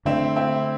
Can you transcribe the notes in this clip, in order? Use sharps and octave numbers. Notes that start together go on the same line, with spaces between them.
D3 A3 C4 D4 E4
C4 E4